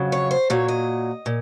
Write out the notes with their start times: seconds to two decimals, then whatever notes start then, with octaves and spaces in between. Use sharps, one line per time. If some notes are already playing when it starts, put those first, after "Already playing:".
Already playing: F2 C#3 F#3
0.12 C#5
0.31 C5
0.50 A#2 F#3 C#5
0.68 D#5
1.26 A#2